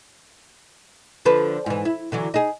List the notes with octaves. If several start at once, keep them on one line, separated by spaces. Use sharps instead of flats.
D3 F3 B4
G#2 E3
E4
D3 E3 F#3
D#4 G#4